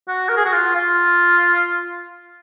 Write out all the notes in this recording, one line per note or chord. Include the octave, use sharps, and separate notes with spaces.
F#4
A#4
G#4
F#4
F4
F4